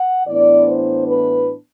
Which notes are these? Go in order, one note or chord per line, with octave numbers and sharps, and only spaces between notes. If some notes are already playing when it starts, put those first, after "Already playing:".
Already playing: F#5
A2 E3 B3 D4 D5
C5
B4